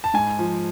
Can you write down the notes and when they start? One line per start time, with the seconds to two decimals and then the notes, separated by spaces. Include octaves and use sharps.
0.04 A5
0.14 G#2 G#5
0.39 F3